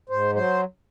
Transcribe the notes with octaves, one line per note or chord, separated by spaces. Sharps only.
G#2 C5
F#3 C5